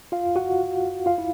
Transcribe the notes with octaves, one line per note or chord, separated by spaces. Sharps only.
F4 F5
F#4 F#5
F4 F5
E4